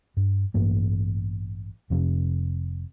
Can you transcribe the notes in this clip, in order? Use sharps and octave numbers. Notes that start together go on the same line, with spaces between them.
G2
A1 G2 A#3
F1 F2 C3